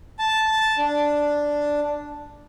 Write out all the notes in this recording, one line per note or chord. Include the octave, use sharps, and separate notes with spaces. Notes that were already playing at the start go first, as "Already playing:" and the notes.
A5
D4